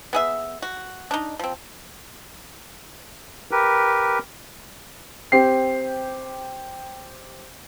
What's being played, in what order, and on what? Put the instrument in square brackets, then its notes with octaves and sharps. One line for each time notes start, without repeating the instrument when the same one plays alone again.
[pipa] B3 G#4 E5
F#4
D4 D#4
F3 C4
[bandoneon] G4 A#4 B4
[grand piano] C4 G4 C7